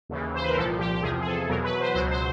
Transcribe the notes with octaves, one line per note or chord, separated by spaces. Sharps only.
D#2 C#3 E3
C5
B4
A#4
C2 A#2 F3 A4
G4
G4
E2 C3 F3 G#4
G#4
A4
E2 B2 F#3 A#4
B4
C5
C#2 B2 F#3 C5
C5